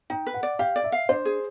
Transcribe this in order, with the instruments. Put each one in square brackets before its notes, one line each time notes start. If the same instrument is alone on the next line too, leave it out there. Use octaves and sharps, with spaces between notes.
[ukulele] D#4 [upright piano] G5
[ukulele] B4
[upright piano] F#5
[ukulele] D5
[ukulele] G4 [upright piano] F5
[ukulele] D5
[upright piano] E5
[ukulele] F5
[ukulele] D4 [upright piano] C5
[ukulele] G#4